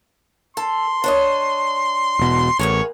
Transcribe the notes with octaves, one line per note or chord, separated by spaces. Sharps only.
A4 C6
D4 C#5 D#5
E1 B2
A1 E2 A#3 G#4 C#5